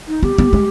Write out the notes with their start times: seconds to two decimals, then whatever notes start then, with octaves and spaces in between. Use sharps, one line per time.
0.08 D#4
0.23 B3 G4
0.38 B3
0.53 G#3